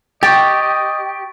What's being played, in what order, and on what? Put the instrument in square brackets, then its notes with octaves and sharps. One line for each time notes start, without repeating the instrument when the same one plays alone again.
[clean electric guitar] G4 [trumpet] D#5 [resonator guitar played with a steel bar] G5 [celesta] C#6 A6